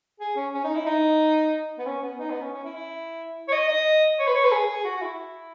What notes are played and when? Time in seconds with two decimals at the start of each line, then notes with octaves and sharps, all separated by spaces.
0.20 G#4
0.36 C#4
0.54 C#4
0.64 D#4
0.75 E4
0.86 D#4
1.78 B3
1.86 C#4
2.02 B3
2.19 D#4
2.30 B3
2.41 C#4
2.53 C#4
2.64 E4
2.75 E4
3.48 C#5
3.53 D#5
3.68 D#5
4.19 C#5
4.28 B4
4.35 C#5
4.44 B4
4.52 G#4
4.68 G#4
4.85 F#4
4.96 F#4
5.02 E4